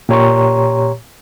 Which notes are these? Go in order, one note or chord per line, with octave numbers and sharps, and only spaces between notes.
A#2 G4 C#5 A#5 C6 C#6